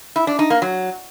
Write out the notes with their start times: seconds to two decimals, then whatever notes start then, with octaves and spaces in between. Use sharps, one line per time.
0.16 E4
0.27 D4
0.39 D#4
0.50 A#3
0.62 F#3